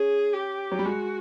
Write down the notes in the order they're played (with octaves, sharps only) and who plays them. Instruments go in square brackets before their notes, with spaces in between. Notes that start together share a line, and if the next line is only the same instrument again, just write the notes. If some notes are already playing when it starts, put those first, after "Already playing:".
Already playing: [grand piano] C#4 [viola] G#4
[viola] G4
[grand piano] F#3
G3
[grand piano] G#3 [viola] F#4